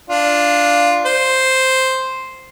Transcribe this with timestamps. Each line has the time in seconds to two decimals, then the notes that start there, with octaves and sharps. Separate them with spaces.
0.10 D4 F4
1.06 C5